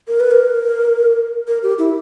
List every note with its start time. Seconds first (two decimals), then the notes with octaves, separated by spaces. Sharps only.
0.08 A#4
0.20 B4
0.31 A#4
1.48 A#4
1.63 G4
1.79 E4